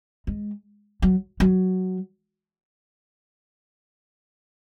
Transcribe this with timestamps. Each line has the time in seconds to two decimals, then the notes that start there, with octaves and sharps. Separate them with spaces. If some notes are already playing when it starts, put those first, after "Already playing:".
0.27 G#3
1.02 F#3
1.40 F#3